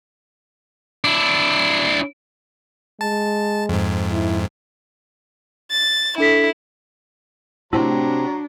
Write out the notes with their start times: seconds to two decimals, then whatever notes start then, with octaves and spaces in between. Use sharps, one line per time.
1.04 D4 E4
3.01 G#3 A5
3.69 F2 G#2
4.11 E4
5.71 A6
6.18 D4 E4 A4 B6
7.73 A2 C3 F#3 C4 D4 G4 A#5